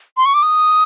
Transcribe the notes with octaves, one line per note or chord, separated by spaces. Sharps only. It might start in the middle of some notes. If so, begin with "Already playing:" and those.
C6
C#6
D6
D#6